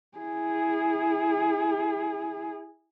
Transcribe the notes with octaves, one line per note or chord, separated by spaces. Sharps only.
E4 G#4